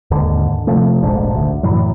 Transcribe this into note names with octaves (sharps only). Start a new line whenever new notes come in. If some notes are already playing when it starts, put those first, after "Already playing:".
D#2 G#2 D3
C3 F3 A3
E1 A#1 G#2 D4
D2
F#2 A2 E3 F#3